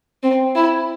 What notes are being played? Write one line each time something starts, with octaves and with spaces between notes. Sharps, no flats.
C4
E4